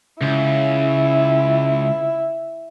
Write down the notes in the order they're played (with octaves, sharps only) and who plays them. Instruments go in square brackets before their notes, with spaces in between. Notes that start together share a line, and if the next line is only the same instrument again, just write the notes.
[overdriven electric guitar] C#2 [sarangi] E4